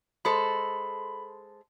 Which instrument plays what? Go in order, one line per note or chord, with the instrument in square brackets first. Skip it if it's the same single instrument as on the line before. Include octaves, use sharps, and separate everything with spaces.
[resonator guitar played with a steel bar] G#3 A4 C5 [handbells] B5